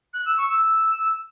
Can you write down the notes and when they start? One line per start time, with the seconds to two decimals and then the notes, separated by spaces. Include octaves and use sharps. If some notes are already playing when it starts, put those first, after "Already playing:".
0.13 F#6
0.25 E6
0.37 C#6
0.49 E6